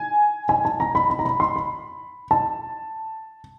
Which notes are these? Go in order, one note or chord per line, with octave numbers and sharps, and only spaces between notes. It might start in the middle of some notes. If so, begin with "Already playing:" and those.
Already playing: G#5
G#5
A5
A#5
B5
B5
A#5
B5
C6
B5
A5